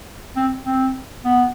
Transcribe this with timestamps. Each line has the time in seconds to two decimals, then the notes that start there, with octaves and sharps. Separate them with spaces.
0.36 C4
0.66 C4
1.25 B3